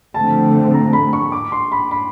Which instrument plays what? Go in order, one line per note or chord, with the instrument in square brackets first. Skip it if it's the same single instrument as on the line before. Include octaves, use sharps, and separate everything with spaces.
[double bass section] D3 F3 A3 C4 [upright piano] A5
[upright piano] A#5
B5
C#6
D6
C6
B5
B5